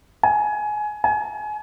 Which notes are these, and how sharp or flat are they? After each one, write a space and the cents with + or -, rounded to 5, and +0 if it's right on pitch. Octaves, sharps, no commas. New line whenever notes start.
G#5 +20
G#5 +30